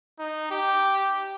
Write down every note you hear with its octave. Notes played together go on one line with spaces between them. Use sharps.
D#4
G4